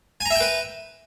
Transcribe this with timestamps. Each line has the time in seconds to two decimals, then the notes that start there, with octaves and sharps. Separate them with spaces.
0.21 G#5
0.26 A#5
0.30 E5
0.35 G5
0.40 B4